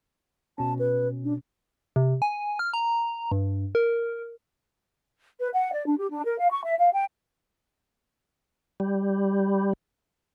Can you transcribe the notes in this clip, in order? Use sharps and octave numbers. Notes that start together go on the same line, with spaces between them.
B2 C#4 A5
B4
D4
C3
G#5
F6
A#5
G2
A#4
B4
F#5
D5
D4
G4
D4
A#4
F5
C#6
E5
F5
G5
G3